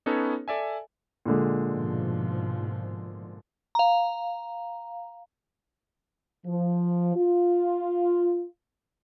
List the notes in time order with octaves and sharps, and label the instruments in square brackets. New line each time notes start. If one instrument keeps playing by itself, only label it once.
[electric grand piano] B3 C#4 D#4 A4 B4 C#5
A4 D5 E5 G#5
[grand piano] A#2 D3 G#3
[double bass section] G#2 B2 F3
[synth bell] F5 A#5
[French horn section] F3
F4